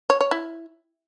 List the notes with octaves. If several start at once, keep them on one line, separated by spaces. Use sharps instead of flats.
C#5
C#5
E4